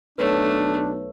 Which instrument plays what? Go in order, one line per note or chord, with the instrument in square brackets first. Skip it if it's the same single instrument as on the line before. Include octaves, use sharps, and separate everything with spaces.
[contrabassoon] B1 [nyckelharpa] A3 [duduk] D4 [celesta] B4 C#5